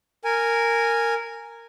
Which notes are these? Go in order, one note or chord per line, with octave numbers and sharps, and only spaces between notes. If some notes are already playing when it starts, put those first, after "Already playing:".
A#4 G#5